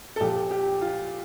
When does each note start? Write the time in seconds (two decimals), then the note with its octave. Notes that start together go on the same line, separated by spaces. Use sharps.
0.16 A4
0.20 A#2 F3 G4
0.51 G4
0.81 F4